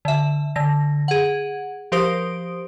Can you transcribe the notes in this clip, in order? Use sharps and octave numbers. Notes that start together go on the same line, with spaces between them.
D3 E5
D3 A#6
G#4 F#5
F3 G4 A#4 C5 D#6 D7